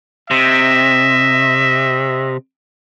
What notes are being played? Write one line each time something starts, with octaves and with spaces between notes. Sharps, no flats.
C3 D#5 E5